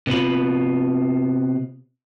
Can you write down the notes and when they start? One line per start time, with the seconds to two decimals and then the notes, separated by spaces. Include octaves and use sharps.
0.07 C3 B3 F4 B5